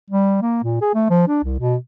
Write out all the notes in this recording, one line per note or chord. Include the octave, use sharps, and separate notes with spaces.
G3
A#3
A#2
G#4
A3
F3
D4
C2
B2